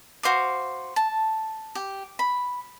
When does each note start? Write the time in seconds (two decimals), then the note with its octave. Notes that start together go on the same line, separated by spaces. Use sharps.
0.23 F#4 C5 F5 D6
0.96 A5
1.75 G4
2.19 B5